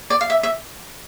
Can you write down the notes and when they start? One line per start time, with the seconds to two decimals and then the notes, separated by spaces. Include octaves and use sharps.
0.10 D5
0.21 F5
0.30 E5
0.43 E5